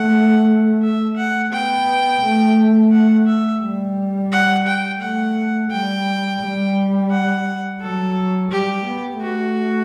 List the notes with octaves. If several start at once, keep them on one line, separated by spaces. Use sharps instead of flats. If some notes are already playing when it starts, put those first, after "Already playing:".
Already playing: A3 F#5
E5
F#5
B3 G5
A3
F#5
E5
G3
F#5
G5
A3 F#5
G3 G5
G3
F#5
F#3 A4
G3 G4
B3
A3 F#4